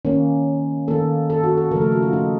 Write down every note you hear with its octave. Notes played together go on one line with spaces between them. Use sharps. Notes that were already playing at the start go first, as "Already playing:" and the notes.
D#3 A#3 C#4
D#3 A#3 A4
A4
F#4
A4
C#3 F3 A3 A#4
A4
F#4
F4
D#4